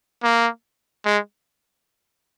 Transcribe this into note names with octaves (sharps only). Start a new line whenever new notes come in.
A#3
G#3